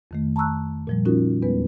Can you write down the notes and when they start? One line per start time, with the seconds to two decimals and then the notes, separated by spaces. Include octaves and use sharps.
0.11 F2 D#3 A3
0.36 A5 A#5 C#6 E6 F#6
0.87 A#2 F3 G3
1.05 C#4 D#4 F4 F#4 A#4
1.42 E2 G3 G#3 B3 B4